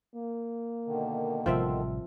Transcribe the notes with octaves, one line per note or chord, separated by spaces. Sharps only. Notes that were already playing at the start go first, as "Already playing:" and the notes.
A#3
B2 D3 D#3
A1 C3 F3 G3 C4 E5